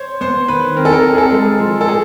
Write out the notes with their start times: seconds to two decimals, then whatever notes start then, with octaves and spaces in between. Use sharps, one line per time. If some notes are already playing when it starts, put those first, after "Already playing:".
Already playing: C5 C#5
0.21 B3 C5
0.48 D#3 B4
0.76 C4 A#4
0.85 A4
0.93 A#4
1.04 C4
1.14 G#4
1.18 A4
1.32 G#3
1.60 F3
1.81 A4
1.88 A2 G#4